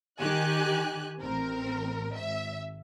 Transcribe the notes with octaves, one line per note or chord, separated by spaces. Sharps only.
D#3 G4 G#5 F#6
A1 C4 A#4
G#1 E5